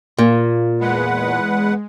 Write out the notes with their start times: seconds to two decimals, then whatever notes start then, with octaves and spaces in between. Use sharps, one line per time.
0.18 A#2 A#3 F4
0.81 E2 G#3 B4 F#5